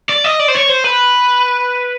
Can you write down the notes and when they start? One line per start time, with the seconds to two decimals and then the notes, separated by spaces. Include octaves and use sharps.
0.09 D5
0.24 D#5
0.40 D5
0.48 C5
0.55 C#5
0.70 C5
0.85 B4